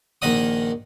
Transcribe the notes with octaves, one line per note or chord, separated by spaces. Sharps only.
A#1 D#3 D#4 D#5 F#5 D#6